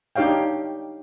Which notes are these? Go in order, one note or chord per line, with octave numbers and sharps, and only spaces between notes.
D4 D#4 G4 C#5 F5 G5